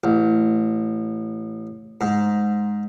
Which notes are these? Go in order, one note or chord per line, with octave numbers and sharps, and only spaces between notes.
A1
G#2